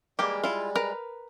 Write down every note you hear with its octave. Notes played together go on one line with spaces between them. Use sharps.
E3 G3 G#3 A#3 G4
E4 F4
A#4 B4 A#5